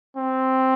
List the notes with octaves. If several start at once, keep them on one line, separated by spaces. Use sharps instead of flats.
C4